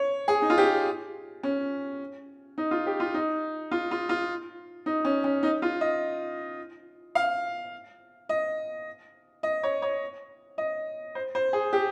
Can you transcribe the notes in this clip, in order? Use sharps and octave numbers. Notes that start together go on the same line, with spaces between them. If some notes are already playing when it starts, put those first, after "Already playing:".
Already playing: C#5
G#4
D#4
F4
G4
C#4
D#4
F4
G4
F4
D#4
F4
F4
F4
D#4
C#4
C#4
D#4
F4
D#5
F5
D#5
D#5
C#5
C#5
D#5
C5
C5
G#4
G4